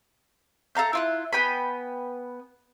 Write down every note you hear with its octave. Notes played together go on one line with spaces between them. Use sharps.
A4 F5 A#5 G6
E4 F4 F#6
B3 G5 G#5 B5